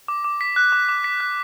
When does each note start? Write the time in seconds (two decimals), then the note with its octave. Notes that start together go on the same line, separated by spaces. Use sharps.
0.08 D6
0.24 D6
0.41 B6
0.56 F#6
0.72 D6
0.89 D6
1.04 B6
1.20 F#6